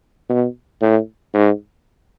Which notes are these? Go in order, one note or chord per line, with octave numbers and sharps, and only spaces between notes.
B2
A2
G#2